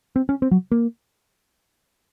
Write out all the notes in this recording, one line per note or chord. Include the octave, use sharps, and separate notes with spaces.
C4
C#4
C4
F#3
A#3